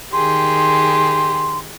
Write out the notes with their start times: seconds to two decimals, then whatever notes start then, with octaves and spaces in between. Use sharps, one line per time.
0.13 D#3 G4 G#4 C6